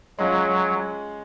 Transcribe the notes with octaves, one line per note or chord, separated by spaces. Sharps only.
F#3 G#3 C#4 F4 G#4